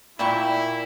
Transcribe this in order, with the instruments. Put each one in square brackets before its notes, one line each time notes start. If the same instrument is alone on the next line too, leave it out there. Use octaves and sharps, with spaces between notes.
[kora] A#2 A#3 D5 [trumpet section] E4 [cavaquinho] E5 G5 C#6 [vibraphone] B5